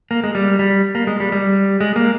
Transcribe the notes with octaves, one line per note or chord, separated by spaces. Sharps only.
A#3
G#3
G3
G3
A#3
G#3
G3
G3
G#3
A#3